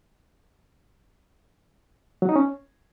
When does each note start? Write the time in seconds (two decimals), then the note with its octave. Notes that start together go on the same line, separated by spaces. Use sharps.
2.22 F#3
2.29 D#4
2.36 C#4